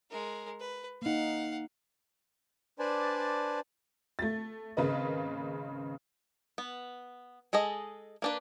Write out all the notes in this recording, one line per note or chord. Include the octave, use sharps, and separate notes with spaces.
G#3 A#4
B4
A#3 D#4 F5 F#5
D4 B4 C5 D5 G#5 A5
A3 A6
G#1 C#3 A#3 B4 D#5
B3
G#3 G#4 A4 D#5
A#3 D4 B4